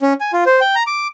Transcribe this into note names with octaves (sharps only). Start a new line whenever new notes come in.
C#4
G#5
F4
C5
G5
A#5
D6